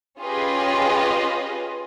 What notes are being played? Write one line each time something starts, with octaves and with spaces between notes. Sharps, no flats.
C#4 F4 G4 G#4 B4 D#5